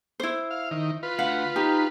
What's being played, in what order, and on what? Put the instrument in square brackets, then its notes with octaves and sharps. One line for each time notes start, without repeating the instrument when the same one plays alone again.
[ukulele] E4 C5
[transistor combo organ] F5
D#3
F4 B4
[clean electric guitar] D2 F#5 [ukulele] F5
[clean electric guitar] D#4 [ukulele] G4